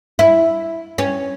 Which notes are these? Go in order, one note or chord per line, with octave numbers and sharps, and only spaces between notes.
E4
C#4